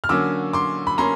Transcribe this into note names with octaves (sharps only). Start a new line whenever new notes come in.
F6
D3 F#3 A#3 C#4 D6 E6
C6 D6
B5
A#3 C#4 A#5 C6